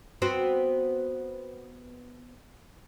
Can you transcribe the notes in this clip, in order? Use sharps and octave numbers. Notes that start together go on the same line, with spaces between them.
B3 C4 F#4